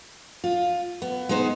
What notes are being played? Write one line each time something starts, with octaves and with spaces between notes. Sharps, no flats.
F4
B3
G#3 B3 D#4 C5